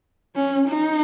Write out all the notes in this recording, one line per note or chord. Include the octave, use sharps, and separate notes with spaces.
C#4
D#4